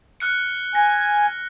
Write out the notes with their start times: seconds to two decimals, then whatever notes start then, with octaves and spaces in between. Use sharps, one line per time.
0.20 F6 F#6 C#7
0.75 G#5 A#6